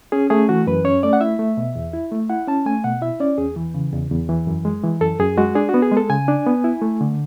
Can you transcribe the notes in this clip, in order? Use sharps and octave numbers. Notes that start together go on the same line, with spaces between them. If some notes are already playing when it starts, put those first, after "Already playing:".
C#4 G#4
A3 G#4
E3 F#4
F#2 B4
C#4 C#5
A3 D5
F#5
E4 E5
A3
B2
E2
E4
A3
E4 F#5
C#4 A5
A3 G#5
B2 F#5
E4 E5
C#4 D5
E2 G#4
E3
C#3
E2
E2
E3
F#2
G#3
E3
F#2 A4
F#2 G#4
G#3 F#4
D4 G#4
F#4
B3
G#4
G#3 A4
C#3 G#5
D4
B3
E4
A3
D3